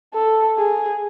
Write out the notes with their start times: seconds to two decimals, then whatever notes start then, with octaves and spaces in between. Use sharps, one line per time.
0.14 A4
0.58 G#4